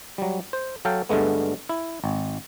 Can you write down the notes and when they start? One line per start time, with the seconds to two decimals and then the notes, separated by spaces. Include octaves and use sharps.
0.18 F#3 G3
0.53 C5
0.85 F#3 A4 F5 G5
1.09 G2 D3 G#3 A3 B3
1.69 E4
2.04 G#1